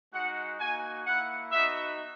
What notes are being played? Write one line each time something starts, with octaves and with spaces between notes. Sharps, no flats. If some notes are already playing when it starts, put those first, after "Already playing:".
G#3 D#4 F#4 F#5
A#3 D#4 F#4 G#5
A#3 E4 F#5
B3 D#4 F#4 E5